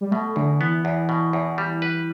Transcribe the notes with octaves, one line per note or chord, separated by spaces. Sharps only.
G3
B2 A3
E2 D3
E3 B3
E2
B2
E2
G3
B4